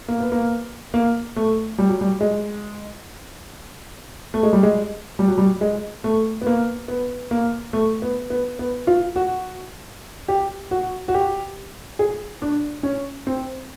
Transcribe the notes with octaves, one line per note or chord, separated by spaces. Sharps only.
A#3
B3
A#3
A#3
A3
G3
F#3
G3
G#3
A3
G#3
G3
G#3
G3
F#3
G3
G#3
A3
B3
A#3
B3
A#3
A3
B3
B3
B3
F4
F#4
G4
F#4
F#4
G4
G#4
D4
C#4
C4